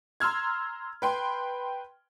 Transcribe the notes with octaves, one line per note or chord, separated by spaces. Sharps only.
A#5 C6 E6 F6 G#6
B4 G5 C6